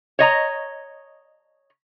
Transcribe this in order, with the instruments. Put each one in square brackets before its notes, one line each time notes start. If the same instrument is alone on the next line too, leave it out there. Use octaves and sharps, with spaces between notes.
[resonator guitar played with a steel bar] C#5 D#5 A#5